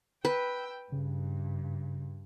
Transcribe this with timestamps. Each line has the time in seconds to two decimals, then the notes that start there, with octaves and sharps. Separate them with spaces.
0.25 B4 G5 E6
0.92 G2 C#3